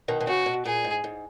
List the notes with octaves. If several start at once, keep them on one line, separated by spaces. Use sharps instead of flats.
B2 D#3
B2
C#3 F#4
B2
A#2 G#4
G#2
G#2